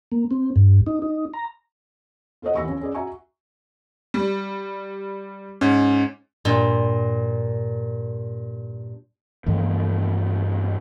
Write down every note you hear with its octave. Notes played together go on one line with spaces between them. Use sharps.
A#3
C4
G2
D#4
D#4
A#5
F4 A4 C5 C#5 D#5 F#5
D#2 E3 C#6 E6 A#6
F3 C#4
C#4 G#4 D5
F#4 E5 G#5 A#5 C#6
G3
G#2 C#4
G2 A#2
G2 E3 F3 A3